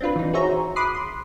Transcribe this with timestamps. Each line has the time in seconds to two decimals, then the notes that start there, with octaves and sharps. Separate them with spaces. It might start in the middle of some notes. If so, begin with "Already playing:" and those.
0.01 C4 D4 F4 B4
0.16 E3 D#4
0.33 F#4 G#4 C5 C#5 E5 A#5
0.76 B5 C6 D6 D#6 F#6 C7
0.95 C6